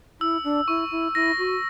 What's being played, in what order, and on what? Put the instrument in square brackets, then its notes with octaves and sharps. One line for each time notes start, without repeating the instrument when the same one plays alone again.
[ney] E4 [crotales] E6
[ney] D4
[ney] E4 [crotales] C#6
[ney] E4
[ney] E4 [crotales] A#6
[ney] F#4